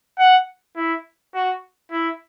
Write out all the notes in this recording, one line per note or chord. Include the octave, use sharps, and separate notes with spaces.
F#5
E4
F#4
E4